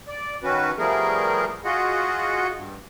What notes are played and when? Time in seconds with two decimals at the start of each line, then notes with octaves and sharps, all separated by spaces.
0.08 D5
0.43 D#3 C#4 F#4 B4
0.78 F3 G3 A3 B3 G#4 A#4
1.65 F4 F#4 G#4 D#5 F#5
2.54 G2